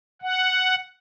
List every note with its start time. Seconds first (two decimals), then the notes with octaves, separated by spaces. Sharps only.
0.22 F#5